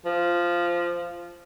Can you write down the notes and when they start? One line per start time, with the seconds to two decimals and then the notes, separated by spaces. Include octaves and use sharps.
0.05 F3